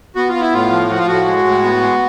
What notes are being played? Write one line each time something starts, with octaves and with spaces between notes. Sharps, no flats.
B3 F#4
F4
B3
E4
A2 F4
F3
F3 F#4
F4
A2 F#4
G#3
A2
B3
G#3